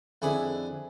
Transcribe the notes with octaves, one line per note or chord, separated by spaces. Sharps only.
F2 D3 E4 G#4 B5